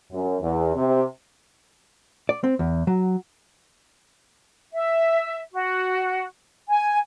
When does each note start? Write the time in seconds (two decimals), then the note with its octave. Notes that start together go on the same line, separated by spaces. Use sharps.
0.12 F#2
0.41 E2
0.75 C3
2.29 D5
2.44 C4
2.59 E2
2.87 F#3
4.74 E5
5.53 F#4
6.69 G#5